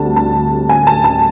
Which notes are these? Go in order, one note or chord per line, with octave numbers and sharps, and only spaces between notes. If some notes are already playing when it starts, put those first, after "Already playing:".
Already playing: D2 D3 G3 C4 A5
A5
G#5
A5
A5